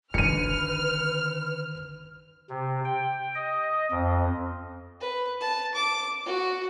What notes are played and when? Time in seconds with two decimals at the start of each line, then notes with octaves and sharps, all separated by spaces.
0.14 D3 D#3 B4 F6 C#7 D#7
2.49 C3
2.85 G5
3.35 D#5
3.91 F2
5.00 B4
5.40 A5
5.75 D6
6.26 F#4